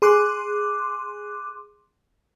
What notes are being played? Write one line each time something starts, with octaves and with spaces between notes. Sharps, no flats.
G#4 C6 D6 F#6